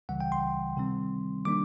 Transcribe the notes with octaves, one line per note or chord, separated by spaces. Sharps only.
C#2 C#3 E3 G3 F#5
G5
C6
C3 D#3 G3 C4
D#3 G3 A#3 D4 D6